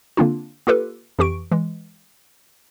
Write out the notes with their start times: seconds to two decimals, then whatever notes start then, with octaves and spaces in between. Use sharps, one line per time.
0.17 D3 A#3 C4 D4 F4
0.67 A#3 F4 G4 A4 B4
1.19 F2 E3 G4 C#6 D7
1.51 E3 G#3